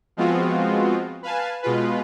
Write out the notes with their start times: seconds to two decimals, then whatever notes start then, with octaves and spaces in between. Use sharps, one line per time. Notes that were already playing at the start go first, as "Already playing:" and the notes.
0.17 F3 G#3 B3 C4 F4 F#4
1.23 B4 F5 G#5 A5
1.63 B2 G#3 F4 B4